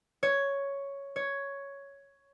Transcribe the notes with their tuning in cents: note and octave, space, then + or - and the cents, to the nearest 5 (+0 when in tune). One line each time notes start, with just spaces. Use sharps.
C#5 +5
C#5 +5